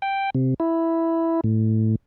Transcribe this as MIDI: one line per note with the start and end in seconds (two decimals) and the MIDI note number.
0.02 0.30 79
0.35 0.54 48
0.60 1.41 64
1.44 1.96 45